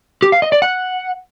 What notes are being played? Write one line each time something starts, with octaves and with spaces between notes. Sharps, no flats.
G4
F5
D#5
D5
F#5